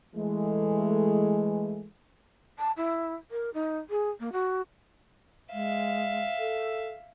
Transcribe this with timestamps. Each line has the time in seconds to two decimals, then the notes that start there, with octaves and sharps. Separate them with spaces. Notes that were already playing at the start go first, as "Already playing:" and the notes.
0.16 E3 G#3 A3
2.58 A5
2.77 E4
3.31 A#4
3.54 D#4
3.90 G#4
4.19 A#3
4.32 F#4
5.53 G#3 E5 F5
6.39 A4